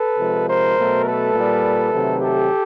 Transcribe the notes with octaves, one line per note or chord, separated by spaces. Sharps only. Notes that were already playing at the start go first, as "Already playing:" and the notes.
Already playing: A4 B4
C3 F3 G#3
A#4 C5
B2 F#3 A3
A4 B4
A#2 G3
C3 D#3 F#3 A3
G4 A4